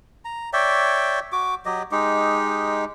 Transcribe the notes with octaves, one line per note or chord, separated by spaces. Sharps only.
A#5
C#5 D5 E5 G5
F#4 D6
F#3 G4 D#5
G#3 D#4 G4